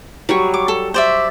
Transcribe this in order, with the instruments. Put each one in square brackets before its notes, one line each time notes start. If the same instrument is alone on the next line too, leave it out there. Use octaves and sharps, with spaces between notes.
[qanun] F#3 G3 C#5
[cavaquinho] D6
A4
C5 D5 E5